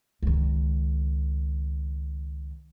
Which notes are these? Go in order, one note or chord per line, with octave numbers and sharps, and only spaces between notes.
C#2 D#3